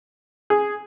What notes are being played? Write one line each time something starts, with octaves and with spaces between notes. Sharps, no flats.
G#4